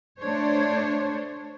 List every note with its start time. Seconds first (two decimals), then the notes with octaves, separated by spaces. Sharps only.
0.20 A3 D4 C5 C#5